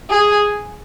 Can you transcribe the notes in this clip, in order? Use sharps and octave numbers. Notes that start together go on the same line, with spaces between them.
G#4